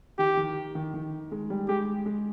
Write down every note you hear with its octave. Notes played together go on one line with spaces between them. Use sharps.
D#3 G4
D#3
D#3
D#3
G#3
G3
G#3 G4
G#3